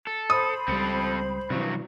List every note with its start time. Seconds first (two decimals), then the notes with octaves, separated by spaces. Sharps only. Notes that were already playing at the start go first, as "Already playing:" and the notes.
0.07 A4
0.30 C5 B5 D#6
0.68 C#2 G3 C4 A4
1.50 G2 C3 E3 F#3